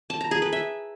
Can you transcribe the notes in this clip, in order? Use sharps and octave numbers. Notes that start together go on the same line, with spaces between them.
A5
A#5
G#4
B4
E5